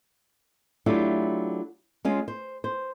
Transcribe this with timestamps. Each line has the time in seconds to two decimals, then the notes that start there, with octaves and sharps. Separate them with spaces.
0.86 F#3 A3 D4 E4 F4 G4
2.05 G#3 C#4 F4
2.28 C5
2.64 C5